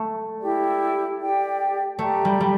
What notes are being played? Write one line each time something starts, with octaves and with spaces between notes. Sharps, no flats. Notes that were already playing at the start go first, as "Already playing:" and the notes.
Already playing: A3
E4 G4 D5
G4 D5 G5
A3 G4 D5 G5 A#5
G3
G3